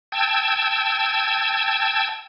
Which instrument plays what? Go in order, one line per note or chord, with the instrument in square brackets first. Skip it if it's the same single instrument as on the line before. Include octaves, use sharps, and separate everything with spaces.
[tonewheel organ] G5 A5 E6 G#6